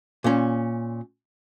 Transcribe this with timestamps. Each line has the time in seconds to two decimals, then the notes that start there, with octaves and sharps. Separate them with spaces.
0.24 A#2 C#4